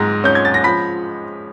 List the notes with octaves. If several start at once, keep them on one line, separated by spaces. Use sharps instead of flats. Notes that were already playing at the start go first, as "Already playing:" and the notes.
Already playing: G#2 G#3 A#5 A#6
C#4 G6
G#6
A6
A#6
F3 B5 B6